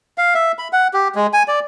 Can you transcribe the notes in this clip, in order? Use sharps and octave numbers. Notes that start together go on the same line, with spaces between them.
F5
E5
B5
F#5
G4
G#3
G#5
D5